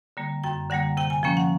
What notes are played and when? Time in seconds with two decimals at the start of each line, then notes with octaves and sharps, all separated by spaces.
0.17 D3 G3 A#3
0.44 F#2 G5
0.70 D3 G3 A#3 F#5
0.97 C3 G5
1.10 G#5
1.23 F3 A#3 C#4 G5
1.37 F#5